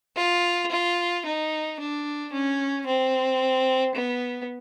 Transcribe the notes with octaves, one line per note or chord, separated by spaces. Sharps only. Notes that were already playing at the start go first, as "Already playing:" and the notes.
F4
F4
D#4
D4
C#4
C4
B3